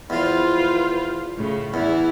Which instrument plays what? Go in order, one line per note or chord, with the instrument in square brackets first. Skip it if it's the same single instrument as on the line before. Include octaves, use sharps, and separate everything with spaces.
[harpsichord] E2 F3 [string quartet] F4 B4 C5
[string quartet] A2 C#3
[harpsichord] E2 [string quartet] E3 E4